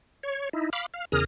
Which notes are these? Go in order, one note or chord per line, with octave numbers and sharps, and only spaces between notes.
C#5
D#4 E4
F5 B5 D6
F5
E2 C#3 G#4 A#4 D#6 F6